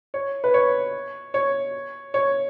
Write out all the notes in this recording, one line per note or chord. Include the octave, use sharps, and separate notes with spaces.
C#5
B4
C#5
C#5
C#5